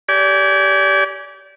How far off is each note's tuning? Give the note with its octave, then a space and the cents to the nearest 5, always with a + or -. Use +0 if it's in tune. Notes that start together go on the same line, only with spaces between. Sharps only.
G4 -15 D5 -30 G#5 +0